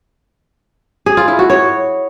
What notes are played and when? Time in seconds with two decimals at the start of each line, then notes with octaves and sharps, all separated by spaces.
1.06 G#4
1.17 F4
1.28 E4
1.39 F#4
1.50 C#5